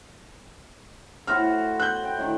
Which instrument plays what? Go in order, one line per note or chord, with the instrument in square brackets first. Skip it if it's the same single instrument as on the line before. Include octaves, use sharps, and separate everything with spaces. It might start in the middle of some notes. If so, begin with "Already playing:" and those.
[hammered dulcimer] A2 F#4 C5 [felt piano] F6
[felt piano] F#6 G6
[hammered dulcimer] G5
A2 D3 D#3